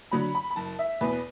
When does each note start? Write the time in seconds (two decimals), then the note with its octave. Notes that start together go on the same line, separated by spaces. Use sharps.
0.11 D3 F#3 B5
0.35 B5
0.50 B5
0.56 F#1 A5
0.79 E5
1.01 E2 B2 B4